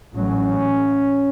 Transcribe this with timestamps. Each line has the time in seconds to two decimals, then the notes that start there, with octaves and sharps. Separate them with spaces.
0.16 A1 A2 F#3 C#4